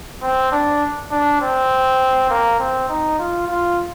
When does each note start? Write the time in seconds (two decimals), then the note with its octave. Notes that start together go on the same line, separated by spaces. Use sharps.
0.23 C4
0.52 D4
1.11 D4
1.41 C4
2.30 A#3
2.59 C4
2.89 D#4
3.19 F4
3.48 F4